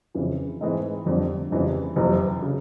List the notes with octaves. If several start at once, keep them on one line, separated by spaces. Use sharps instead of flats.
F2 C#3 E3
G#2 E3 G#3 C4 D#4
F1 F2 D3 G3
F1 F2 C#3 E3 G3
F#1 F2 C3 E3
C#3